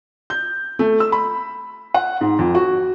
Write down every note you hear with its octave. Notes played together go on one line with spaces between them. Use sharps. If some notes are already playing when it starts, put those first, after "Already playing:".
G6
A3
E6
B5
F#5
G#2
F2
F#4